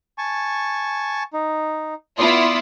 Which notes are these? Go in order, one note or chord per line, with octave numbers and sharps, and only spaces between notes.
G#5 A5 C#6
D#4
B3 E4 F4 D5 C6 D#6